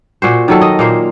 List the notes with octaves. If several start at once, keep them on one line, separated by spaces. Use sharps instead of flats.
A#2 F#4 C5
D#3 F#3 A4
D#5
A#2 A#3 C5